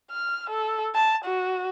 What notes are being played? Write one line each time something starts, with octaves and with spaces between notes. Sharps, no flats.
F6
A4
A5
F#4